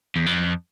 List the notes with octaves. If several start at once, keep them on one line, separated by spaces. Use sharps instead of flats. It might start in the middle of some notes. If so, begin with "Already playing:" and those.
E2
F2